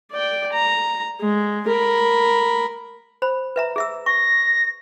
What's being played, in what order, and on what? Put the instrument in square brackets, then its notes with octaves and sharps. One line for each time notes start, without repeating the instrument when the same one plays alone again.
[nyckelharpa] D5 G5
A#5
G#3
A#4 B5
[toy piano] C5 B5
B4 E5 A#5
G#4 E5 E6
[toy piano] C#6 [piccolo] A#6